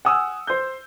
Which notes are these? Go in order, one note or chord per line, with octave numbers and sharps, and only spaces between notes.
F#5 G#5 D#6 E6
C5 G6